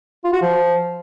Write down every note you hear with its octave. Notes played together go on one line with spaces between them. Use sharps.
F4
F#4
F3